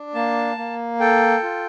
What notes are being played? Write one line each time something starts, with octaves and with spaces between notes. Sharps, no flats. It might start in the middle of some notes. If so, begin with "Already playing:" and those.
Already playing: D4
A#3 A5
A#3
A4 G5
F4